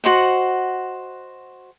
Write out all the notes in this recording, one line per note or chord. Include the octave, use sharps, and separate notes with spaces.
F#4 C5 D#5 F#5